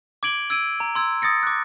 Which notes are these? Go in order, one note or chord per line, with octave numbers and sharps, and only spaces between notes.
D6 G#6 D7 F#7 G7
E6 G#6 D7 D#7
A#5
C6 E6 G#6
D#6 A6 A#6 C#7
D6 F#6